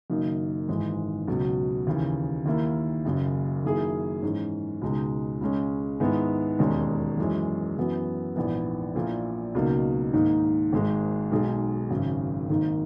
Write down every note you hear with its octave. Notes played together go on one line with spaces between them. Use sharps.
F#1 F#2 D#3 A#3 D#4
G#1 G#2 E3 G#3
C#2 B2 F#3
D#2 C#3 E3
D#2 D#3 A#3 E4
F#1 F#2 C#3
F#2 D#3 A#3 E4 G#4
G#2 E3 G#3 C#4
C#2 B2 G#3 D#4
C#2 C#3 G#3 C#4
G#2 D#3 G#3 B3 E4
E1 D#2 D#3 G#3 C#4
F#2 E3 G#3 C#4
F#2 E3 B3 F#4
A#1 G#2 E3 B3
A#1 A#2 A#3 E4
C#2 B2 F#3 A#3 D#4
G#2 D#3 A#3 D#4
G#1 G#2 D#3 G#3
B1 B2 G#3 D#4 G#4
G#1 F#2 C#3
G#1 G#2 D#3 A#3 D#4